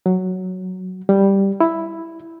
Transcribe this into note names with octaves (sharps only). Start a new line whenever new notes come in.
F#3
G3
E4